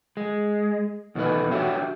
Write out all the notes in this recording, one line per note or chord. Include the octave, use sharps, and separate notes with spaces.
G#3
E2 B2 D#3 A3 B4
D4 F#4 G4 C#5 E5